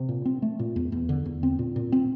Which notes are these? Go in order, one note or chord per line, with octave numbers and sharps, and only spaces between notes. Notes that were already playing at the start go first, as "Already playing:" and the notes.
Already playing: C3
A#2
C4
A3
A#2
E2
E2
D3
E2
C4
A#2
A#2
C4